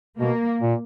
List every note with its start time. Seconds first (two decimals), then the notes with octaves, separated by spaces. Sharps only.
0.19 B2 A#3
0.62 A#2